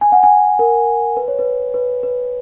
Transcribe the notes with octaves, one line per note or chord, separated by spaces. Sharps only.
G#5
F#5
G#5
A#4
B4
C#5
B4
B4
B4